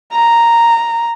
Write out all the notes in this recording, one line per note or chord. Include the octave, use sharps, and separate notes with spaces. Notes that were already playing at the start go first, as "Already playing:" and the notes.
A#5